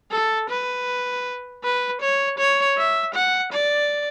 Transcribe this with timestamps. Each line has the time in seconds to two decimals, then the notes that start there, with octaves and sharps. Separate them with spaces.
0.11 A4
0.49 B4
1.63 B4
2.01 C#5
2.38 C#5
2.77 E5
3.14 F#5
3.52 D5